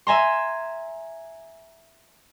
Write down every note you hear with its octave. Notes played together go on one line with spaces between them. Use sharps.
E5 G#5 A#5 C6